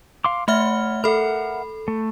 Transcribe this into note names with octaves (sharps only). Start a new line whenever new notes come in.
F5 C6 D6
A3 C#5 E5 F#5 B5 F6
A4 A#4 E5 F#5 B5
A3